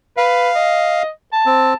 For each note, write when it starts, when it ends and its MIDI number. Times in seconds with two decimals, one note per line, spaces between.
0.17 0.50 71
0.17 1.03 77
0.56 1.09 75
1.33 1.73 81
1.46 1.74 60